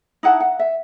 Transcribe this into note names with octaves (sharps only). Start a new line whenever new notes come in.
D#4 E4 F#5 A5
F#5
E5